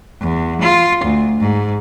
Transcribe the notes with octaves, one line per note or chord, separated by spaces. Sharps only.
E2
F4
D2
G#2